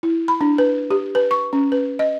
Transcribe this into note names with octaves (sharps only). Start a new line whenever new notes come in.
E4
B5
D4
B4
G4
B4
C#6
C#4
B4
D#5